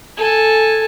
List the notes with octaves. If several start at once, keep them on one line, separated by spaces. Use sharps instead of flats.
A4 G#5